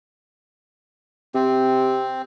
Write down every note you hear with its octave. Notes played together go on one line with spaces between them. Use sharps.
C3 C4